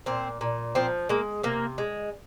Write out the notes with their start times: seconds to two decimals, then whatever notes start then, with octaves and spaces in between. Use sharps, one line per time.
0.06 A#2 C4
0.41 A#2
0.75 F3 C4
1.09 G#3 A#3
1.43 C3 A#3
1.78 G#3